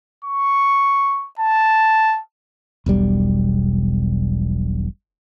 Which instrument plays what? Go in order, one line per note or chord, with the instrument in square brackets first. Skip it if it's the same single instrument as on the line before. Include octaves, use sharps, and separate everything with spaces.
[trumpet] C#6
A5
[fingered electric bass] E1 B1 G3